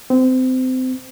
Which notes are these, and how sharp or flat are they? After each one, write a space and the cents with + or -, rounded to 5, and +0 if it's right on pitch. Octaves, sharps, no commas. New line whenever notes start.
C4 -25